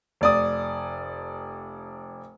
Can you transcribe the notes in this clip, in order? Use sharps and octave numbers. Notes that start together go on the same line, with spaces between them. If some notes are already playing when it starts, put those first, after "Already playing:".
F1 D5 D#6